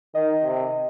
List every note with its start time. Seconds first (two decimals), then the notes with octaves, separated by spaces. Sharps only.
0.15 D#3 D#5
0.44 C3